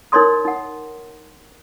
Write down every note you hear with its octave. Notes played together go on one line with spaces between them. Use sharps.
D#4 A#4 C#5 D5 C6 D#6
D#4 F#5